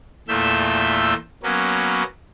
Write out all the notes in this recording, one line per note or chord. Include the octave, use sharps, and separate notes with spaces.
E2 A#2 A3 E5 E6 G6
F#3 A#3 B3 C#4